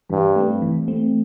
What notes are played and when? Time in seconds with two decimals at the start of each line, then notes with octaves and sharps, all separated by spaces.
0.10 G2 E3
0.36 A3 C4
0.62 E3
0.88 A3 C4